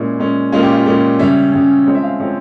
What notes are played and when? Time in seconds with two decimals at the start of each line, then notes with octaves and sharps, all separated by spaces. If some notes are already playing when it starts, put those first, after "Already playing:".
Already playing: A#2 G#3 C#4 E4
0.19 A#2 G#3 C#4
0.52 A#2 G#3 C#4 F4
0.63 G4
0.73 F4
0.86 A#2 G#3 C#4
1.19 C#3 G3 C#4 E5
1.53 C#3 G3 C#4
1.86 F3 G#3 C4 C#5
1.95 E5
2.03 F5
2.20 F3 G#3 C4 C#5